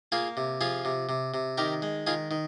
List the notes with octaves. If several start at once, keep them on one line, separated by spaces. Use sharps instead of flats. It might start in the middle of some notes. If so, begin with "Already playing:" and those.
A#3 F4 G#4
C3
F3 F4 G#4
C3
C3
C3
D#3 G4 A#4
G#3
D#3 F4 G#4
D#3